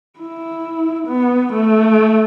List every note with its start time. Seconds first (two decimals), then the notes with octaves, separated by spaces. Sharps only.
0.19 E4
1.08 B3
1.53 A3